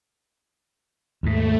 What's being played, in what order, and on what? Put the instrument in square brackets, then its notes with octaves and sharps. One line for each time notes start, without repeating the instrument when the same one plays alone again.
[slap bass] D#2 G#2 [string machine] A3